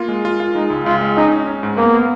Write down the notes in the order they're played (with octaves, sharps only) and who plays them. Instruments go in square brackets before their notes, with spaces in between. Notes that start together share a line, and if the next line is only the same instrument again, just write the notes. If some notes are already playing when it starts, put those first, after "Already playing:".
Already playing: [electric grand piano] A#3 F4
G#3
F4
F4
[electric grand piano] G#3 [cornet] D#4
[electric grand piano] C#2
[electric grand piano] C#2 [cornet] F4
[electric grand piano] G#3
[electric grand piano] C#4 [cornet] D#4
[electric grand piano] C#4
C#4
G#2
[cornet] A#3 [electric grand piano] B3
[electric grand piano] B3